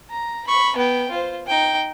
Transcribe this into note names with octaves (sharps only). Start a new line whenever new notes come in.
A#5
B5 C#6
B3 G5
F4 C5
D#4 G5